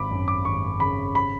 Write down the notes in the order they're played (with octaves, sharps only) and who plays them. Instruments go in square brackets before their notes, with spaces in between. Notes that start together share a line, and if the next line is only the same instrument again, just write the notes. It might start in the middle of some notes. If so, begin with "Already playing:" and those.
Already playing: [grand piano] G#1 B5 D6
F#2
D6
G#1 C#6
C#3 B5
B5